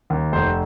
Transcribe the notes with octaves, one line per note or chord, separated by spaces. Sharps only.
D#2
F1 C5